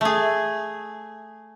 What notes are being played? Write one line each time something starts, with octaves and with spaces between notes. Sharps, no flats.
A3 G#4